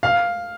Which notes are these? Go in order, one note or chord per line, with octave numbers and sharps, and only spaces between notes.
F5